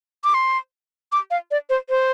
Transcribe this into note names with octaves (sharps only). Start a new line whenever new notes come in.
D6
C6
D6
F5
D5
C5
C5